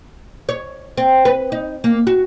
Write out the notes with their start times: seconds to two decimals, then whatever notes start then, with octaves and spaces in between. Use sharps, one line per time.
0.49 C#5
0.97 C4
1.25 B4
1.52 D#4
1.84 A#3
2.07 F#4